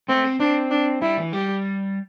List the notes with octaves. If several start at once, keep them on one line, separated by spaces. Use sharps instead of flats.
A3 C4
C4
C4 D4
D4
G3 E4
E3
G3 G4